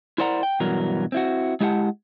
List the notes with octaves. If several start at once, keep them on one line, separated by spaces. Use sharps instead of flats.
E4 A#4 C5 D5 F#5 A#5
G5
G2 B2 E3 F#3 A#4
C4 E4 F#4
G#3 E4 G4 D#5 F#5 A5